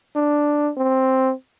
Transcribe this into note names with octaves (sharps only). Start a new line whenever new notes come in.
D4
C4